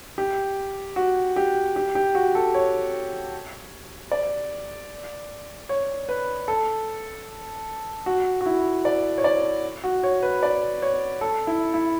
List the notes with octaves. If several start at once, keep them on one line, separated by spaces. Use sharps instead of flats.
G4
F#4
G4
G4
G4
F#4
A4
C#5
D5
C#5
B4
A4
F#4
F#4
E4
D5
C#5
D5
F#4
C#5
B4
D5
C#5
A4
E4
E4